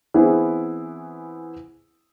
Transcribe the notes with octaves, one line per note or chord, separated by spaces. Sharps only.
E3 B3 C4 E4 G#4